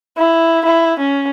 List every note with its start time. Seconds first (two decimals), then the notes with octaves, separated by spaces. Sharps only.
0.17 E4
0.65 E4
0.99 C#4